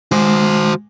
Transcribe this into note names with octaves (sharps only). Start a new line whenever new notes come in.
C#2 G#3 F#4 C5